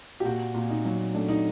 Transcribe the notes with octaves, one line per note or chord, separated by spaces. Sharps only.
G4
A#2 F#4
A#2
D#4
F#3
A3 D4
D#4